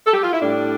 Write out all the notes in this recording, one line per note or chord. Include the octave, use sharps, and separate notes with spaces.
A4
G4
F4
E4
A2 G3 D4